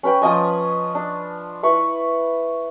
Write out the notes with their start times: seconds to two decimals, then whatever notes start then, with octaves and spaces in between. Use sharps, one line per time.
0.03 C#4 B4 G5
0.22 F3 C#4 D#5 G#5
0.95 D4
1.63 E4 B4 C#6